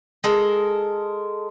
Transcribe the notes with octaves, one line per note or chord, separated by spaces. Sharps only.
G#3 A4 A#4